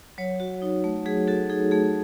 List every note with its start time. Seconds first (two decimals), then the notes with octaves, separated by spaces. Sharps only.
0.18 F#3 C#5
0.40 F#4
0.62 D#4
0.84 A3
1.06 F#3 G#4
1.27 F#4 A4
1.50 D#4 G#4
1.71 A3 G#4